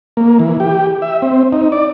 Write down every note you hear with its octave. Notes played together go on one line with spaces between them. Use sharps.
A#3
E3
G4
E5
C4
D#4
D5